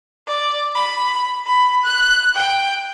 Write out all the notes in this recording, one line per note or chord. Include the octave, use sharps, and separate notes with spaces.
D5
B5
B5
F#6
G5